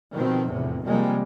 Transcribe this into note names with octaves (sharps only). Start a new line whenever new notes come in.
B2 D#3 F3 C4
F1 E2 A2 C3
C3 D#3 F3 G3 G#3 A#3